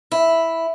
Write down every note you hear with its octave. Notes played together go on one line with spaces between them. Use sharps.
E4